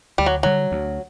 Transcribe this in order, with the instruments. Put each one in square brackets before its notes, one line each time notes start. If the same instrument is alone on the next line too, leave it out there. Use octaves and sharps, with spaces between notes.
[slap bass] D2 [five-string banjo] G3
[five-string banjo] F#3
[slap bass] D3 G3 [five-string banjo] F#3
[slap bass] D2